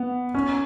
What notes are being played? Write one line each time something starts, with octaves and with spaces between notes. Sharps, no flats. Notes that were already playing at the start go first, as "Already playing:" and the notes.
Already playing: B3
C#4